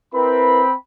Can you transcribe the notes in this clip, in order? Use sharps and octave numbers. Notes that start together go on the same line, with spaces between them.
C4 E4 A#4 B4 B5